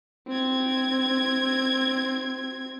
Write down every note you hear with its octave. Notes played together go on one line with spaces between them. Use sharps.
C4 G#6